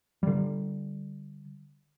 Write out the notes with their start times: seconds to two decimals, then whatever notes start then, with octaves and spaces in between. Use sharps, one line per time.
0.23 D3 G3